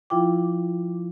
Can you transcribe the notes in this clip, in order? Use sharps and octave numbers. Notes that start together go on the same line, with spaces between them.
F3 E4 F4 G5 D6